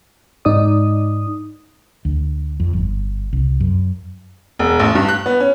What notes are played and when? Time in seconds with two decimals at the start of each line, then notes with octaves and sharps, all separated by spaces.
0.45 G#2 D#4 D5 D#6
2.05 D2
2.60 F2
2.73 G1
3.33 C2
3.60 F#2
4.59 E1
4.79 A1
4.95 G2
5.09 F#6
5.26 B3
5.40 C#4